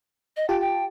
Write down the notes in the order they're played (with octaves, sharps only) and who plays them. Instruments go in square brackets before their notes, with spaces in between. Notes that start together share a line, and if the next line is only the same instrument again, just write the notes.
[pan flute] D#5
[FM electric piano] F4 G4 A5 [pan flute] G5
[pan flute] G5